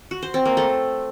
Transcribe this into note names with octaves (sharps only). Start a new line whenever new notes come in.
F#4
C5
C4
A#3
A3